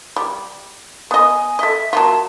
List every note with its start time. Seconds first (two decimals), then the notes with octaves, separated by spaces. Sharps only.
0.16 G3
1.11 B3 D#5 G#5
1.59 A4 D#5 E5
1.93 F#3 A#3 F4 A5